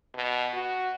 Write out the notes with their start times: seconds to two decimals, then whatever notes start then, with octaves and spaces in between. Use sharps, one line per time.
0.15 B2
0.53 F#4